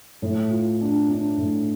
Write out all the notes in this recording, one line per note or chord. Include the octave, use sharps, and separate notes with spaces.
A2
F4
D4
D4
A2